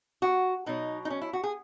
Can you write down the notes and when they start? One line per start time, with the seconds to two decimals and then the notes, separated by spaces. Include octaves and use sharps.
0.22 F#4
0.66 B2 F#3 D#4
1.05 D#4
1.10 C#4
1.21 E4
1.33 F#4
1.43 G#4